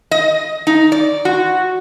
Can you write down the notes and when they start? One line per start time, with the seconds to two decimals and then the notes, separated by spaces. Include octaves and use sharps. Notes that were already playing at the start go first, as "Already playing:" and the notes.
0.11 D#5
0.67 D#4
0.92 D5
1.25 F#4